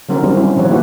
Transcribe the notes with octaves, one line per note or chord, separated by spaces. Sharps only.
D3 D#3 F#3 C#4 D#4 A#4
G3 C4 D4 F#4 G4
G3 C4 C#4 E4
D#3 F3 F#3 F#4 C#5
A#3 E4 F#4 G4 B4